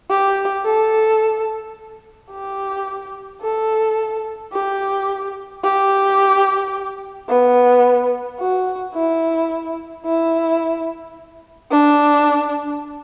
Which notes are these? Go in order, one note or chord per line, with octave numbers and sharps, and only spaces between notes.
G4
A4
G4
A4
G4
G4
B3
F#4
E4
E4
D4